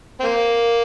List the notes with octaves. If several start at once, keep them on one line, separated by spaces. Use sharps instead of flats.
C4
A#3